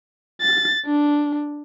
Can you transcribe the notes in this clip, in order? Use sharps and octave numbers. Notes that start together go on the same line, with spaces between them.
A6
D4